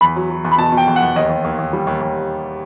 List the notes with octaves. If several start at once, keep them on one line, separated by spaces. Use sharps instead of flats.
E2 B5
F#3
F#3
E2
B5
B2 A5
B2
G5
E2
F#5
E2
D#2 D#5
D#2
D#2
D#2
G3
D#2
D#2